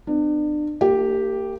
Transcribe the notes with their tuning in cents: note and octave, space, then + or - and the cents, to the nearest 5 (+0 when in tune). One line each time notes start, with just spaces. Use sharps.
B3 +40 D4 +35
A#3 -35 G4 +0